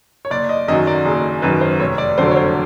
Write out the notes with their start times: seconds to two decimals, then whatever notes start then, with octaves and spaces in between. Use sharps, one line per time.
0.25 C#5
0.30 F#1 D5
0.49 D#5
0.68 F#2 D#3 F#3 D#5
0.87 D5
1.05 F#1 G#4
1.42 F#2 D#3 F#3 B4
1.61 C5
1.79 F1 C#5
1.98 D5
2.18 F2 D3 F#3 C5
2.31 C#5
2.36 C5